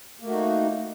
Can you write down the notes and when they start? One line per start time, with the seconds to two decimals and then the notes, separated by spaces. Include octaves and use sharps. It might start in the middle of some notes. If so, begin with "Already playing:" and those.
0.20 A#3
0.23 A3
0.27 F#4
0.30 D#4